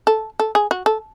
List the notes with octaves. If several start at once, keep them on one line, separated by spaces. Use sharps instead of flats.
A4
A4
G#4
F#4
A4